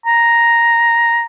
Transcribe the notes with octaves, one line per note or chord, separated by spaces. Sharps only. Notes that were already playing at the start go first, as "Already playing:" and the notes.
A#5